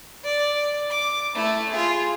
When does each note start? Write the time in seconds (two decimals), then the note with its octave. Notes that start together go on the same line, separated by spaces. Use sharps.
0.25 D5
0.90 D6
1.35 A3 E4
1.71 F4 G#4